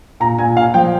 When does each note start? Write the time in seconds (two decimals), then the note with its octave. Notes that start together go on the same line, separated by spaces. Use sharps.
0.20 A#2 A#5
0.38 A#2 G#5
0.56 A#2 F5
0.74 F3 G5